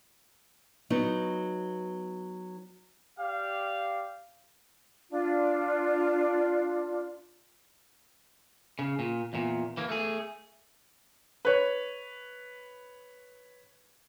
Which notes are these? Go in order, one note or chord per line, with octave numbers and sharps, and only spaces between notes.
F#3 B3 D#4
G4 D5 F5
D4 F4
C#3
A#2
E2 A#2
E3 A#3
A3 G#4
B4 C#5